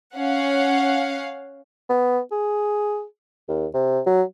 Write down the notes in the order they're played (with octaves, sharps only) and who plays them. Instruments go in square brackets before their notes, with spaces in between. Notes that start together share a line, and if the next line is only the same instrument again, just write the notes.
[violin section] C#4 F5 F#5
[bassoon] B3
G#4
D#2
C3
F#3